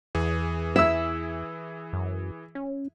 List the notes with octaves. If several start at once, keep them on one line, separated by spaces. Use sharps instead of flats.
E2 E3 G#4
E4 E5 E6
F#2
C#4